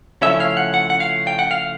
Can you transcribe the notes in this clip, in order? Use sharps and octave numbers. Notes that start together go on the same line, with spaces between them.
C#3 F3 A3 C#4 E4 E5
F5
F#5
F#5
F#5
F5
G5
F#5
F5